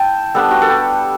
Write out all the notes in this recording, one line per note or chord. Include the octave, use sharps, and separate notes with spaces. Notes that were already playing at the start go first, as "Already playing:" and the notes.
Already playing: E4 G5 A5
G3 B3 D4 A4
F#4
A4
G4